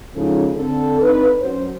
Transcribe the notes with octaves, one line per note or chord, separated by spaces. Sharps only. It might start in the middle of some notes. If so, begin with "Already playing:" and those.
G#2 C#3 F3 C#4 D#4 A4
D3 C4 A4
C4 D4 D#4 B4
F#2 F#3 C#4 C5